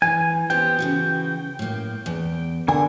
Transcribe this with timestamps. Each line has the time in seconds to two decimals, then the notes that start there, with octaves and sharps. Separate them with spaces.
0.02 E3 G#5
0.50 B3 C4 G4 G5
0.79 C#3 E3 F#4
1.59 A2 A#3
2.06 E2
2.68 D3 A#4 G#5